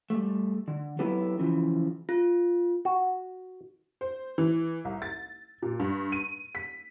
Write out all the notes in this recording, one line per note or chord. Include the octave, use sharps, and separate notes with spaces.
G3 A3
D3
F#3 B3 E4 G4 A4 B4
C#3 E3 F3
F4
F#4
C5
E3
C2
A6
A#2
G2
D#7
B6